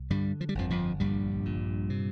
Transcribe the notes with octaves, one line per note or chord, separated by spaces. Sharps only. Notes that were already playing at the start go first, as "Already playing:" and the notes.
Already playing: C2
G2 D3 G3
F3
G3
G1 F2 F3
F2 F3
A#1 G2 G3
A#2
C3